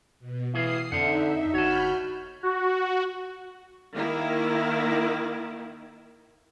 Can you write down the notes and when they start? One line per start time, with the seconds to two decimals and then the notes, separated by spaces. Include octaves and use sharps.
0.20 B2
0.54 A2 E3 G#4 F5 D#6 C7
0.92 F2 D3 D#4 C5 E5 F#5
1.54 G1 F#4 C#5 A5 B5 F6 G6
2.43 F#4
3.95 D#3 A#3 E4